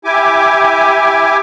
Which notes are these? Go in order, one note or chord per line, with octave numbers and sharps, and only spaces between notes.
E4 G4 G#5 D6